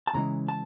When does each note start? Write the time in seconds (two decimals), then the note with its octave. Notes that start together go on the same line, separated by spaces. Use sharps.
0.07 A5
0.14 E2 C#3 E3 G#3 A#5
0.48 A5